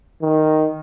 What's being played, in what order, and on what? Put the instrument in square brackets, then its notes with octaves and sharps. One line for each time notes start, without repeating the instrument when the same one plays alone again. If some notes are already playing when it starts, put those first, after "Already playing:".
[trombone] D#3